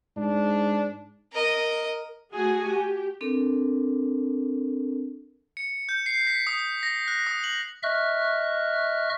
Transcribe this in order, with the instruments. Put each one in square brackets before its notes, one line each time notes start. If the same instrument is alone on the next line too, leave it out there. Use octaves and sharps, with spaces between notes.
[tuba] G#2 [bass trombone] D4
[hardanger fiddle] A#4 D#5
[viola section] A3 F#4 G#4 G#5
G4
[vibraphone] C4 D4 A4 A#4
[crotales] C#7
G6
C7
B6
D#6
A#6
F#6
D#6
F#7
[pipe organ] D#5 E5 C#6 F6 F#6